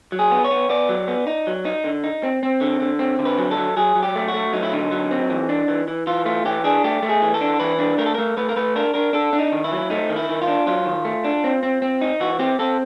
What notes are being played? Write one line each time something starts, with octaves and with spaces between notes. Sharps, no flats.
F#3
G#4
B3
C#5
B3
B3 D5
F#3
B3
D#4
F#3
D#4
D3
D#4
C4
C4
D3
D3
C4
D3
B4
F#3
A4
F#3
F#3 G#4
F#3
G4
A3
F#4
A3
F#3 D#4
E4
D3 D#4
F#3
C4
E3
D4
E3
E3
E3 F4
A3 F4
E3 G4
D4 G#4
A3 G4
A3
G#4
E3
A4
D4
E3 B4
D4
A3 A#4
A4
A3 A#4
A3 B4
A#4
A3 B4
D4 A#4
D4 A#4
D4 A4
D4
D#4
D#3
E4
F#3
A3 D#4
D#3
E4
D#3
F4
D4
F#3 F4
D#3
A3
D4
C4
C4
C4
D#4
E3 F#4
C4 G4
C4 A4